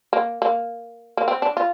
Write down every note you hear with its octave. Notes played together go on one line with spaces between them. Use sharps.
A#3
A#3
A#3
C4
D4
F4